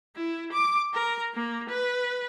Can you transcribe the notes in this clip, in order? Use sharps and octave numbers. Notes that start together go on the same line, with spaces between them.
E4
D6
A#4
A#3
B4